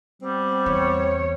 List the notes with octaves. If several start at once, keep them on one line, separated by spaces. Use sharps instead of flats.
G3 B3 C4
E2 C#5